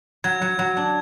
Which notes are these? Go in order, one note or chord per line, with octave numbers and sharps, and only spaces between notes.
F#3 G#6
F#3
F#3
D4